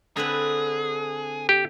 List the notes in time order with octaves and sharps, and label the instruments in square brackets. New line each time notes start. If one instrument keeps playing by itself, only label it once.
[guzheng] D3 C4 B4 [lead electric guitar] G#4
[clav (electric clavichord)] G4